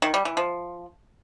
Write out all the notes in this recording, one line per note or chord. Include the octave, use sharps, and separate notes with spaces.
D#3
G3
E3
F3